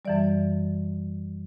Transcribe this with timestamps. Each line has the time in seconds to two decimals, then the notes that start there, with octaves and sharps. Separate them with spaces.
0.05 F#2 E3 G3 D5